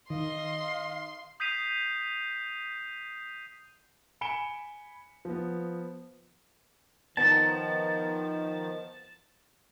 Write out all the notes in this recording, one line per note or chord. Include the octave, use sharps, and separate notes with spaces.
D#3 D#5 F5 C6
D#6 G6 B6 C7 D#7 F7
G#5 B5 C#7 D7 E7 G7
F3 B3
D#3 F3 B3 A5 A#5